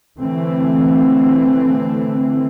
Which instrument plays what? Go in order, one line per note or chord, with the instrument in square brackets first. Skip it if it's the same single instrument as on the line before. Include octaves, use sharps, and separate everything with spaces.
[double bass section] D3 E3 A3 C4